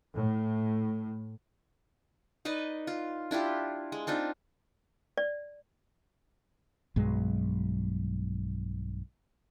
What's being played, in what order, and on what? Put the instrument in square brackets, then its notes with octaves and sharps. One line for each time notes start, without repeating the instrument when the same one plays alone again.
[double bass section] A2
[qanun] D#4 B4 D5 D#5
F4
D4 E4 F4 G4
G#3
C4 D4 D#4 F4
[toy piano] D5
[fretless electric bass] B1 G2 F#3 G#3